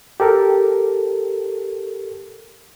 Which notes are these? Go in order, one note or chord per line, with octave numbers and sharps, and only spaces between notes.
G4 A4 A#4